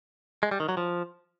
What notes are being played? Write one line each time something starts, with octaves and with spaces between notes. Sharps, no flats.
G#3
G3
D#3
F#3
F3